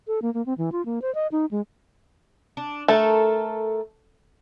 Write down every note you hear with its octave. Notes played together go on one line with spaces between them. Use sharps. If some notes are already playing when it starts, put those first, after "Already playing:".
A4
A#3
A#3
C4
E3
F4
A#3
C5
D#5
D#4
G#3
D4
A3 A4 A#4